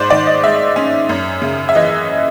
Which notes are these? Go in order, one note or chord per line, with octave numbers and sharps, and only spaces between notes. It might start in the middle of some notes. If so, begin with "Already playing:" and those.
Already playing: G#2 C5 D5
D#3 D5
D#5
G#3 E5
C#4
F#2
C#3
E5
E3 D#5